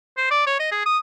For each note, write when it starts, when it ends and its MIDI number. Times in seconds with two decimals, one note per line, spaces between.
0.17 0.26 72
0.31 0.46 74
0.47 0.56 73
0.60 0.69 75
0.72 0.82 68
0.86 0.98 87